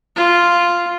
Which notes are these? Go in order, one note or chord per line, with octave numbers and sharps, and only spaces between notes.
F4